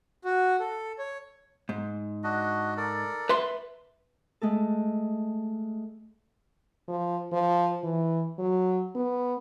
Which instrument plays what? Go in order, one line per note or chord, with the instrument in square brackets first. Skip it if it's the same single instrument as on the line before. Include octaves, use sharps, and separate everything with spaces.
[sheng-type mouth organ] F#4
A4
C#5
[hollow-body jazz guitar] G#2
[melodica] D4 F#4 D#5
A4 A#4 D5
[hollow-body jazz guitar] B4 E5 C6
[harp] G#3 A3 A4
[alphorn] F3
F3
E3
F#3
B3